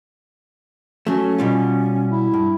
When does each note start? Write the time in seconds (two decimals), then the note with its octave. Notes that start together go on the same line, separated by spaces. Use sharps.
1.07 F#3 A3 C#4
1.39 B2 G3 F4
2.10 E4
2.34 G2